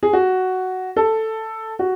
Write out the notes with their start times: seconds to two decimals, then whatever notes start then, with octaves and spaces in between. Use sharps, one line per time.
0.03 G#4
0.13 F#4
0.96 A4
1.79 F#4